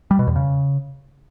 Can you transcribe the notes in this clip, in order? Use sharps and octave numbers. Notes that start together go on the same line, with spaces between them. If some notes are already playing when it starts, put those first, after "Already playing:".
G3
B2
E2
C#3